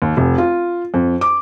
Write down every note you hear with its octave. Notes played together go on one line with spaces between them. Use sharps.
D#2
F1
F4
F2
D6